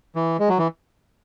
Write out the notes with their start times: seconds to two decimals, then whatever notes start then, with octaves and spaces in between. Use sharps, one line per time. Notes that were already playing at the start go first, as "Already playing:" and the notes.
0.16 E3
0.39 G#3
0.49 F#3
0.58 E3